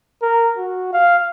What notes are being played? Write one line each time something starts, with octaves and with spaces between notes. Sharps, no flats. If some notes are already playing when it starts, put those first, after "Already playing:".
A#4
F#4
F5